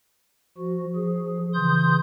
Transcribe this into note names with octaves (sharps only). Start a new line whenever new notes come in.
F3 F#4
F3 G#4
C#3 E3 C6 D#6 G6